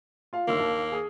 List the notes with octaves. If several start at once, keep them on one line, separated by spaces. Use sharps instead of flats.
F4 F5
G1 D#3 A#3 E6
D#2
G#4 D#6